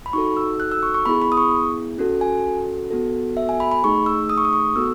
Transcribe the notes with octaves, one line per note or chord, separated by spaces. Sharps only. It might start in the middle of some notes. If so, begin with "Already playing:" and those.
B5
D#4 F#4 A4 C#6
E6
F#6
E6
C#6
C#6
B3 E4 G#4 B5
B5
D#6
C#6
C#4 F#4 A4
G#5
B3 F#4 A4
E5
G#5
B5
B5
A3 D#4 G#4 C#6
E6
D#6
C#6
D#6
C#6
B3 F#4 A4 E6